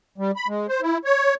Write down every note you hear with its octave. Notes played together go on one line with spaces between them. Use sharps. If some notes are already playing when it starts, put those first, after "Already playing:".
G3
B5
G#3
C5
E4
C#5